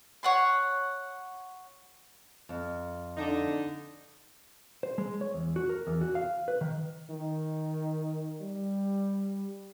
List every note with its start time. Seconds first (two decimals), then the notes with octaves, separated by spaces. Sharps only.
0.23 C#5 F#5 C6
2.49 F2
3.17 D3 D4 D#4
4.83 C5
4.98 G#3
5.21 C#5
5.34 E2
5.56 F#4
5.69 A#4
5.87 E2
6.01 F#4
6.15 F5
6.48 B4
6.61 D#3
7.10 D#3
8.41 G3